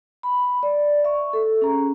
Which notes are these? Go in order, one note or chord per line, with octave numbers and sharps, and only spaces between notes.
B5
D5
E5 C#6
A4
C#4 G#4 A#5